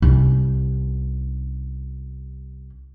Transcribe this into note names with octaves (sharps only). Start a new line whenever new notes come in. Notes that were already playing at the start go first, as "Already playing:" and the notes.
C2 C#4